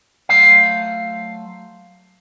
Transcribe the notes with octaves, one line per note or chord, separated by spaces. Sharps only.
F#3 A3 C5 F5